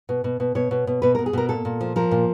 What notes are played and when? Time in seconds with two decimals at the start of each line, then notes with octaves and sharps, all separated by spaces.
0.09 B2
0.24 B2
0.40 B2
0.55 B2 C#5
0.71 B2
0.87 B2
1.02 B2 B4
1.15 B2 A#4
1.26 G#4
1.33 B2 A#4
1.49 A#2 A4
1.65 A#2
1.81 F3
1.96 F3 A#4
2.11 A#2